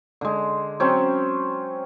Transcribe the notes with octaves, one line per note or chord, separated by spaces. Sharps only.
D3 G#3
F#3 C4 C#4 G5